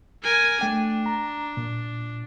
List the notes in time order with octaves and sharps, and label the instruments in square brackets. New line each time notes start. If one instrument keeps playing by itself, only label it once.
[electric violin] A#4 G#5
[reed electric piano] A3 G5 [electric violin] D4
[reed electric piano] A#5
A#2